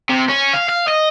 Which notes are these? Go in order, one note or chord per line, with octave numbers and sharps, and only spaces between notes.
C3
C#4
F5
F5
D#5